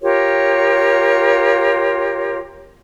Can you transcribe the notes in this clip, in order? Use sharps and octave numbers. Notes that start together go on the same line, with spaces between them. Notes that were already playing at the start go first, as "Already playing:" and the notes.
F4 G4 A#4 C#5